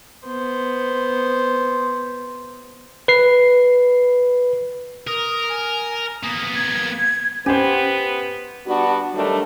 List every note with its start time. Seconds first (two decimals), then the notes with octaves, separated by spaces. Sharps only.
0.27 B3 C5
3.08 B4 C7
5.07 A#4 D#6
5.49 G#5
6.23 A#3 B3 D#6
6.55 G#6
7.46 B3 C#4 G4 C5
8.67 G3 B3 D4 F#4
9.15 D#3 F#3 G3 A3 D4